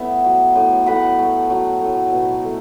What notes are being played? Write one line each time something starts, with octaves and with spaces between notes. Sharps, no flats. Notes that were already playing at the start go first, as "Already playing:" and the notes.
Already playing: A2 B3 E5
F#3
A2
A2 F#5 B5
A3
F#3
A2
B2
A3